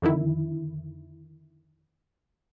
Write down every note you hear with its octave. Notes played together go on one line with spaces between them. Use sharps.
F2 D3 D#3 E4